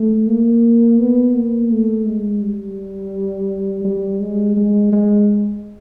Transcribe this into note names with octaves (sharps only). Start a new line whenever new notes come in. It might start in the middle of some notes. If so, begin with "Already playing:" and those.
Already playing: A3
A#3
B3
A#3
A3
G#3
G3
G3
G#3
G#3
G#3